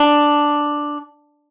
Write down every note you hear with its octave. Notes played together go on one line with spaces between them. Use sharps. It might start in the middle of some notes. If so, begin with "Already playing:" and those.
Already playing: D4